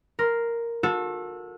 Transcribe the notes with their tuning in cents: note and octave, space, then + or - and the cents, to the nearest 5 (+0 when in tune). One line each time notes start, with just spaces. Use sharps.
A#4 +0 C6 -5
F#4 -45 A4 +0